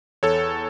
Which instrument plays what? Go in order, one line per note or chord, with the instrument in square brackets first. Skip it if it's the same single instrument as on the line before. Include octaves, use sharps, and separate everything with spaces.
[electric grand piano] E2 A4 C#5